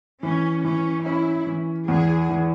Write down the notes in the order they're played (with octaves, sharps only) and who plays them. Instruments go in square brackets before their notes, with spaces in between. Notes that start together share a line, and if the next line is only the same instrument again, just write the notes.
[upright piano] E3 [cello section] C#4
[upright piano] E3 [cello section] C#4
[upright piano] C#4 [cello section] E4
[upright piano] E3
[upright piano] E2 [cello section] G#4
[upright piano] E3